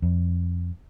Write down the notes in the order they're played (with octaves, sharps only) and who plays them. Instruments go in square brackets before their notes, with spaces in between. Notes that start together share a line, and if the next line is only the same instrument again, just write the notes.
[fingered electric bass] F2